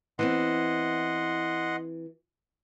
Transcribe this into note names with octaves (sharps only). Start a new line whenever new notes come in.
E3 B3 C4 D#5 F#5 C6